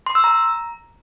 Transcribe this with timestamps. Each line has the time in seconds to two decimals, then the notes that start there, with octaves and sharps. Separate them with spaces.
0.07 C6
0.15 E6
0.24 A#5